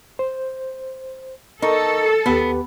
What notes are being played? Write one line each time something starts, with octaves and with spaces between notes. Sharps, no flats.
C5
D#4 A4 A#4 C#6
D#2 B3 G4 B4